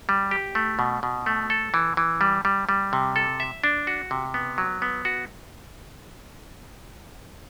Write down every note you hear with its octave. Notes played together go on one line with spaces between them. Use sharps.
G3
G4
A3
B2
B2
A3
A4
E3
E3
G3
G3
G3
C3
A4
E5
D4
F#4
C3
B3
F#3
B3
F#4